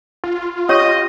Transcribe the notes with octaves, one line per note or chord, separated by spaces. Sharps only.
F4
C#4 G4 C#5 D#5